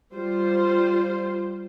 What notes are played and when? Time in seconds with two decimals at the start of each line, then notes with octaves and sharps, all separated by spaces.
0.14 G3 F4 C5